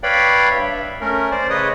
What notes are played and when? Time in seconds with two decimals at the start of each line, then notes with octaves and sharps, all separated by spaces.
0.03 B4 C#5 D5 F5 G5 B5
0.51 G2 E5
1.01 A3 C#4 A#4
1.31 C5 D5
1.50 C#3 B4 C#5 D#5 D#6